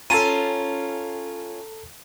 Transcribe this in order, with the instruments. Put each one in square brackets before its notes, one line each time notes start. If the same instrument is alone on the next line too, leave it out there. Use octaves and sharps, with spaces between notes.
[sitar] C#4 F4 [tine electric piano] A4 A5 A#5 [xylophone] D#7